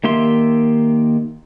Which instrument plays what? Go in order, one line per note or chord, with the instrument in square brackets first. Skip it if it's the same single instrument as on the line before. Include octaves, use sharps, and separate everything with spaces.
[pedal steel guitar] D#3 A#3 G4 E5 C6